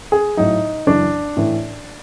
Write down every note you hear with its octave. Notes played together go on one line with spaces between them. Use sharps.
G#4
A2 F#3 D#4
F#2 C#3 E3 D4
A2 E3